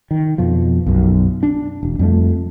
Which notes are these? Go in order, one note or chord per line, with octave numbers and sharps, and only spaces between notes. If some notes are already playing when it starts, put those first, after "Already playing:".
D#3
F2 B2 F3
B1 F#2
D4
E1
F2 G3 A3